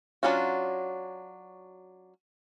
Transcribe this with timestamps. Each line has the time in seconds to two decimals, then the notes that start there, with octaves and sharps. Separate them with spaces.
0.23 F#3 C#4 D4 F4 F#4